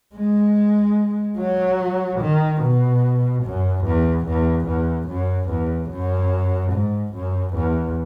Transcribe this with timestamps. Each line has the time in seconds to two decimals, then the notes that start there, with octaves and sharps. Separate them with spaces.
0.15 G#3
1.38 F#3
2.20 D#3
2.62 B2
3.44 F#2
3.85 E2
4.26 E2
4.67 E2
5.08 F#2
5.50 E2
5.91 F#2
6.72 G#2
7.13 F#2
7.55 E2